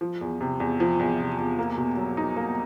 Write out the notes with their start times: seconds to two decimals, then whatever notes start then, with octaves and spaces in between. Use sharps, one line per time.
0.01 F3
0.21 E2
0.41 C3
0.60 E2
0.80 F3
0.99 E2
1.19 C3
1.38 E2
1.59 A#3
1.77 B2
1.97 F#3
2.17 D#4
2.37 A#3